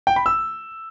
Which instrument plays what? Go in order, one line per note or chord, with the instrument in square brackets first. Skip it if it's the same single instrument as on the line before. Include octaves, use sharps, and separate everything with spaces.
[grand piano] G5
B5
E6